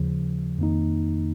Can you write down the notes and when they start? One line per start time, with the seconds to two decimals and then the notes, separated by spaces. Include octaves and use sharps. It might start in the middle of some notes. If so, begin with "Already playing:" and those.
Already playing: D#2 C#3 F3
0.59 F2 D#3 A#3 D#4